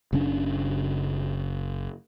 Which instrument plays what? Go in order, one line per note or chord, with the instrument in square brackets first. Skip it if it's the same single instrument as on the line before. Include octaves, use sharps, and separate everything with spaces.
[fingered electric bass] F#1 C#3 C#4 D4